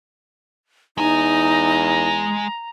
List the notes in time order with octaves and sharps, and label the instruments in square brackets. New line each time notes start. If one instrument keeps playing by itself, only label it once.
[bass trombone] E2 [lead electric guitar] G#3 G#5 [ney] D#4 [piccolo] A#5